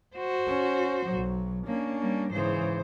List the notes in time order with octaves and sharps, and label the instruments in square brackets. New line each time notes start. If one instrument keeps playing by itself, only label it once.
[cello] F#4 C5
[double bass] C#4
B1 F#3
[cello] A#3 [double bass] C#4 D4
[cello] G3 A#3
[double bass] G#2 E3 [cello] C#3 C5